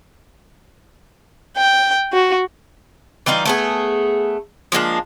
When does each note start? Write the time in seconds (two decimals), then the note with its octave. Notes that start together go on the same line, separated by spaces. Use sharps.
1.57 G5
2.12 F#4
3.26 E3 G3 D#4 F4
3.45 A3 B3 G#4
4.72 F3 G#3 A#3 D4